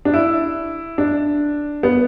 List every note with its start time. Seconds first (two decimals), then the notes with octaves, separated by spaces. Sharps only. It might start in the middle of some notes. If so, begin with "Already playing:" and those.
0.05 D4
0.14 E4
0.98 D4
1.83 B3